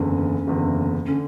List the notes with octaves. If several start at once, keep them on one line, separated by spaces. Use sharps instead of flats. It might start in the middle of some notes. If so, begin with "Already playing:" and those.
Already playing: F#1 E2 D3 C#4
F#1 E2 D3
D3 C#4